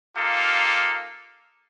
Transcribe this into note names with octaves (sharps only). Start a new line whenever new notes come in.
A#3 D#4 F4 G4 A4 F5